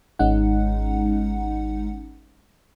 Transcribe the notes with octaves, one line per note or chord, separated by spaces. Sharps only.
G#1 G#3 C#4 D#4 F#5